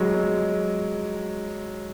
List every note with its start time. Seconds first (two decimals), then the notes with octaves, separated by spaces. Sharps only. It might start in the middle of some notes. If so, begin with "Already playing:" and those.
Already playing: F#3 G#3
0.14 G#3